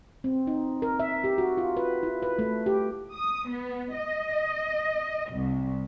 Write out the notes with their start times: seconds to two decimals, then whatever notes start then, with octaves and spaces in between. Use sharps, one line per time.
0.24 C4
0.47 D#4
0.82 A#4
1.00 E5
1.24 G4
1.38 F#4
1.57 F4
1.77 B4
2.03 E4
2.23 B4
2.39 A3
2.66 G4
3.13 D#6
3.50 B3
3.97 D#5
5.32 C2